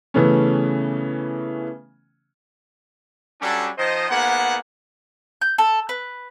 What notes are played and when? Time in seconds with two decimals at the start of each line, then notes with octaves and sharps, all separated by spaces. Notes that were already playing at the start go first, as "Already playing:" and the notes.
0.14 C#3 E3 A3 B3 C#4
3.41 F#3 G3 C#4 D4 F#4 A4
3.77 D#3 F3 C5 D#5
4.09 G#2 A#3 B3 F#5
5.41 G6
5.58 A4
5.89 B4